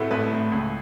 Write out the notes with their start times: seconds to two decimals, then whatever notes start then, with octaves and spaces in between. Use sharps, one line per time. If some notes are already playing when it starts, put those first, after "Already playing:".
Already playing: A2 A3 F#4 B4
0.11 A1 B4
0.32 A2 A3
0.52 C#2